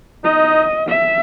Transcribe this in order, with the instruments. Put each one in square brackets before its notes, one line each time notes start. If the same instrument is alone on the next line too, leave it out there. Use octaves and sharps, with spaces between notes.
[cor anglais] D#4 [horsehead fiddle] D#5
[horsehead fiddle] E5